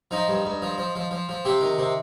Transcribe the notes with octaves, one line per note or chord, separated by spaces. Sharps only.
F3 D#4
G2
G2
F3
F3
F3
F3
F3
C3 G4
D#3
C3